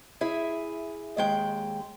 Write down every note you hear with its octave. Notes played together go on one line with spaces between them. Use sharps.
E4 G#4 E5 G#5
D#2 G#3 G5